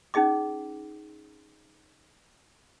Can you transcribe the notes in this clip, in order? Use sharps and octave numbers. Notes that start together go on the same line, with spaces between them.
C#4 D#4 G#4 D#5 D6